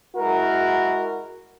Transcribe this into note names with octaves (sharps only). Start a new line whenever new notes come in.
G#3 E4 F#4 A#4